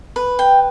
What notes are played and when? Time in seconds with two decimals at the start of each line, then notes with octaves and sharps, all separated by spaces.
0.16 B4
0.39 G5